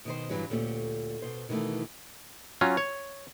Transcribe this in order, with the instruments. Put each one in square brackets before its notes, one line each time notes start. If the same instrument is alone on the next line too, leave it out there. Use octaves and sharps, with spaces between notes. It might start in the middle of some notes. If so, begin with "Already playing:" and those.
[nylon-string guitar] B2 D#3 C5
G2 D3 E3 F#3 G3 C#4
D2 A#2 A3 C#4 F4 G4
B2 C5
B2 D#3 E3 A3
[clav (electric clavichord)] F#3 C#4 F4
C#5